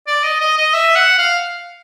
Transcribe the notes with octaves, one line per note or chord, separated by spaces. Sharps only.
D5
D#5
D#5
D#5
E5
F#5
F5